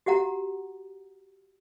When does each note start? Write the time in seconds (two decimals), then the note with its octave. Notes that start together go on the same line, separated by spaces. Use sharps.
0.06 F#4 G4 F#5 A#5